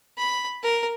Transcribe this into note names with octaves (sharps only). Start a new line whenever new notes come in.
B5
A#4